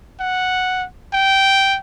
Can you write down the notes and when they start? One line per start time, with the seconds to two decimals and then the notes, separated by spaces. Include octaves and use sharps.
0.20 F#5
1.13 G5